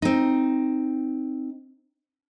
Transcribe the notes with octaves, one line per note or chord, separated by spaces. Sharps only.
C4 D#4